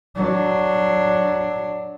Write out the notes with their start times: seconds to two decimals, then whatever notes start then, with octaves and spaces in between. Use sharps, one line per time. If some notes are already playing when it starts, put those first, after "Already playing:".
0.16 F#3 D4